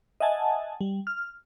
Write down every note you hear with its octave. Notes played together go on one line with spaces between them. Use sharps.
D#5 E5 F#5 G#5 A5
G3
F6